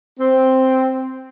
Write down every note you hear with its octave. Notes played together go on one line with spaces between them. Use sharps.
C4